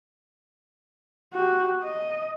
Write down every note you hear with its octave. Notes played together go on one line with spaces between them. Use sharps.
F#4 G4
D#5